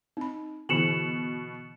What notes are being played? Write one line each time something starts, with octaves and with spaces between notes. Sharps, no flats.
C4 D#4 B5
B2 D3 E3 E4 C#7 E7 F#7